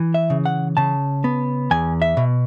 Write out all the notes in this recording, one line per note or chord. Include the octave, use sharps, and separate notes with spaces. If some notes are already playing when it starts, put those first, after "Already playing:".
Already playing: E3
E5
C#3
F#5
C#3 A5
B3
E2 G#5
E5
B2